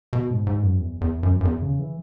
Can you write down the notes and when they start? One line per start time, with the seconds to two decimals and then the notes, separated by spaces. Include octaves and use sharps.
0.13 B2
0.30 G#2
0.47 G#2
0.63 F#2
0.79 E2
1.01 E2
1.23 F#2
1.41 F#2
1.45 E2
1.62 C#3
1.79 E3